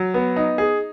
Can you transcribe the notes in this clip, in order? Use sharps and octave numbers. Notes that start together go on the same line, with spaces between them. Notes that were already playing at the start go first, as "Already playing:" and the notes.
Already playing: F#3
B3
D#4
G#4